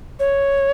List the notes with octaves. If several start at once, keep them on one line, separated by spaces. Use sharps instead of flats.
C#5